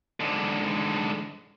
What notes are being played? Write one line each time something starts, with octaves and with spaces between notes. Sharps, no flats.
G#2 D3